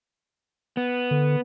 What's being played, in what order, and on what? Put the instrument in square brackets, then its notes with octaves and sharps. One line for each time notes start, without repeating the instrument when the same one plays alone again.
[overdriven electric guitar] B3
[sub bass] D3